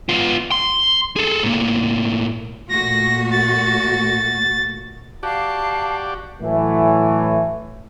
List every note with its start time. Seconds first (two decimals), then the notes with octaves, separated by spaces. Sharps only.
0.09 B3 F4
0.52 C6
1.16 G#4 A4
1.43 A2 A#3
2.69 A#2 A3 F#4 A#6
3.31 A6
5.23 F#4 G4 D5 F5 A5
6.42 A2 E3 F#3 A3